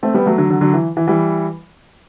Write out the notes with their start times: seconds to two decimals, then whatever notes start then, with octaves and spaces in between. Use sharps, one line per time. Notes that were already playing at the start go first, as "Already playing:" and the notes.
0.03 A3 C4
0.14 G3 B3
0.26 F#3 A3
0.38 D3 F#3
0.50 D3 F#3
0.61 D3 F#3
0.74 E3
0.97 E3
1.07 E3 G3